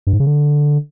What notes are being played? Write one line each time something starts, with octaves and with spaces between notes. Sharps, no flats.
G2
G#2
C#3
D3